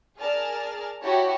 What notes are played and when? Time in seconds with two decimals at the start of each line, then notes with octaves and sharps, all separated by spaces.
0.20 G#4 A#4 D5 A5 F6
1.01 E4 F#4 G4 C#5 F#5 A5